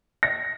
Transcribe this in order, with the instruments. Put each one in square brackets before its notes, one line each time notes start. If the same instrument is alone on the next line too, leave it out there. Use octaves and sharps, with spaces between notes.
[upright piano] A#6